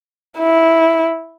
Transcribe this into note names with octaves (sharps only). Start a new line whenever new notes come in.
E4